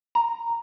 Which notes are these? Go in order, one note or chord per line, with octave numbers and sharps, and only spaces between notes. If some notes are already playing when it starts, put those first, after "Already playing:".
A#5